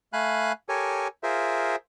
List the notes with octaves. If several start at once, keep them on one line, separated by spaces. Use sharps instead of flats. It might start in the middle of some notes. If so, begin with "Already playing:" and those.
A3 F5 G#5 B5 F#6
G4 A4 A#4 C#5 G#5
F4 G#4 A#4 C5 E5